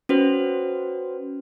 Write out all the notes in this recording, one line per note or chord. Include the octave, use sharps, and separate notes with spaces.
C#4 F#4 B4 C5